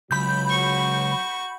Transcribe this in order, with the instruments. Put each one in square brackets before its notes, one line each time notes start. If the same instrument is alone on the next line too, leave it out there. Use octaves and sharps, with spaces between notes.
[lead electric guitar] C#2 [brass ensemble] F#3 [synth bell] B5 G6
[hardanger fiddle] F#4 C#6